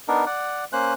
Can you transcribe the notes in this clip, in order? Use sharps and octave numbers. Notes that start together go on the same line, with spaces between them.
B3 D4 D#4 A#4
D5 F#5
A#3 C#4 C5 F#6